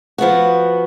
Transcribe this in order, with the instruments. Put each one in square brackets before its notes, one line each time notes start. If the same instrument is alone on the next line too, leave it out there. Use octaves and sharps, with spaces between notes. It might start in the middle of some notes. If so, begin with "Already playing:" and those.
[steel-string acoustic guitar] F3 B3 F#4